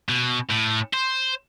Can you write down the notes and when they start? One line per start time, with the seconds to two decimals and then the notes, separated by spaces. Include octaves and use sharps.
0.09 B2
0.50 A2
0.94 C5